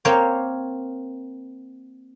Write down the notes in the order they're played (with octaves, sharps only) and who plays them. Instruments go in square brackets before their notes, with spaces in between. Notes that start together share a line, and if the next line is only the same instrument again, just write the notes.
[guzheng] A#3 C4 C#5 F5 G5